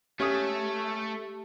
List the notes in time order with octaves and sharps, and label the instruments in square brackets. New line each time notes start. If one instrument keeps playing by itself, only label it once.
[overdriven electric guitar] A3 [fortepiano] C#4 D#6 [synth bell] G4